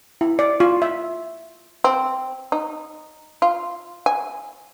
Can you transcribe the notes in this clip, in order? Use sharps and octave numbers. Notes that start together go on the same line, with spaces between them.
E4
D5
F4
E5
C4
D#4
F4
G#5